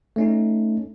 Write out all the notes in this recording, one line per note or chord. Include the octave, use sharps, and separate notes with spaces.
A3 C#4 D#4